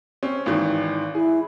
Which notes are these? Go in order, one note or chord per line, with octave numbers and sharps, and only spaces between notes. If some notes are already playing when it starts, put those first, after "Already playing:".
C4 C#4
G#1 D#3 E3
E4 G#4